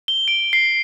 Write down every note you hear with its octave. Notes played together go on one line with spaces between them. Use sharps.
G7
D7
C7